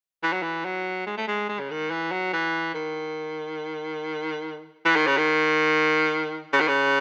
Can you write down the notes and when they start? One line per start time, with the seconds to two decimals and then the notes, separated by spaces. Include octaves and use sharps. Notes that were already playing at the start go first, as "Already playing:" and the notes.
0.23 E3
0.32 F#3
0.42 E3
0.65 F#3
1.07 G#3
1.17 A3
1.28 G#3
1.49 G#3
1.60 C#3
1.70 D#3
1.91 E3
2.12 F#3
2.33 E3
2.74 D#3
4.85 E3
4.96 D#3
5.07 C#3
5.17 D#3
6.53 C#3
6.60 D#3
6.68 C#3